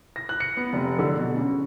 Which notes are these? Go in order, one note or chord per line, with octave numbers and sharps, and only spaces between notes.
A#6
F#6
C#7
B3
F1
D3
B2
C#3